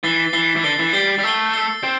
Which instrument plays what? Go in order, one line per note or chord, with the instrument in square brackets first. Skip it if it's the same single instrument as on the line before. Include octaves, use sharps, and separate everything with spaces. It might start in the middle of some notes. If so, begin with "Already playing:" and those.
[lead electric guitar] E3 [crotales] A6 C7 G7
[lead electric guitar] E3 [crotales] A6 C7 G7
[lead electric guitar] E3
[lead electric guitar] D3 [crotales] A6 C7 G7
[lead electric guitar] E3
[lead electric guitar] G3 [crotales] A6 C7 G7
[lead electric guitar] G3
[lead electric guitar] A3 [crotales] E6 C7 G7
[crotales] E6 C7 G7
[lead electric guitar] C4